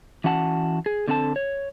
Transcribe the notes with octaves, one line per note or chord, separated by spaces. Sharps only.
E3 C#4 F#4 F#5 A5
G#4
D3 C4 A4 F5 A5
C#5